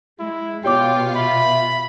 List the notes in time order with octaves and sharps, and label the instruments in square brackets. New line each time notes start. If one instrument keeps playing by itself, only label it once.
[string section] G#3 [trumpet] E4
[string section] B2 F4 [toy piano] G4 C#5 D6 [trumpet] G5
[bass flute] E5 [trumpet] B5